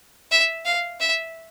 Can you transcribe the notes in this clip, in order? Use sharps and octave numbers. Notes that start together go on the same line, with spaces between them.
E5
F5
E5